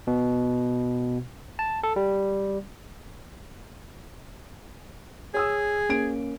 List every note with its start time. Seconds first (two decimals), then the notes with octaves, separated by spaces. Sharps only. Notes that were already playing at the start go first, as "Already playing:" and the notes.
0.07 B2
1.59 A5
1.83 A4
1.96 G3
5.34 G#4 C#5 D#6 E6
5.89 A#3 C#4 D7